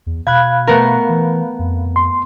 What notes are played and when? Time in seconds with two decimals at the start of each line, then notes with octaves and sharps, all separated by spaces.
0.06 E2
0.27 B2 F5 B5 F#6 G#6
0.67 A3 B3 A#4
1.09 E3
1.59 F2
1.96 C6